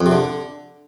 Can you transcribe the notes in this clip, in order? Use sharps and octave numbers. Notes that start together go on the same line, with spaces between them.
F2
C3
D3